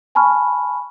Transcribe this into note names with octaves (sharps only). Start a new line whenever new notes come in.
G#5 A5 B5 C#6 F6